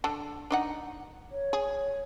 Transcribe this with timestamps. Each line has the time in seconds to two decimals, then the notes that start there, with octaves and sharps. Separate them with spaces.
0.04 D3 A5
0.51 D4 D#4 F#5
1.31 C#5
1.53 G#4